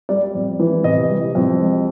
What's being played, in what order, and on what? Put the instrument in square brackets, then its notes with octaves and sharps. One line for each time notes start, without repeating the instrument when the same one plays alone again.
[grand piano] G3 D5
F2
E3
C3 D#5
G3
F2
G#3